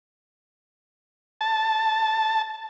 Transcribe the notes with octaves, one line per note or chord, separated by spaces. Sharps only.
A5